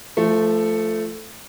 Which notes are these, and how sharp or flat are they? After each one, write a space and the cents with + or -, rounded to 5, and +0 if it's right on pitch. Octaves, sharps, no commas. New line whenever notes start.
F3 -20 A3 +0